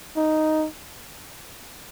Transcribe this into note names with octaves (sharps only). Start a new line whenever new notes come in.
D#4